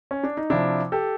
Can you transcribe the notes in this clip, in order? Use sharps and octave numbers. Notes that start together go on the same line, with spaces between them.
C#4
D4
D#4
C3 F3 D4 E4
G4 A4